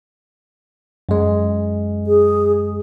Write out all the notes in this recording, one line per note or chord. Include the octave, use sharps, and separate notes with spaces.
F#2 G#3
G#4